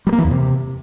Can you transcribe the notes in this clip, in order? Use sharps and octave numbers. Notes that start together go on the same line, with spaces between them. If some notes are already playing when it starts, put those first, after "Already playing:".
G3
A#3
E3
E2
C3